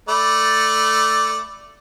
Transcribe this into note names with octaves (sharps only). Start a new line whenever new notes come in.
A3 D5 B5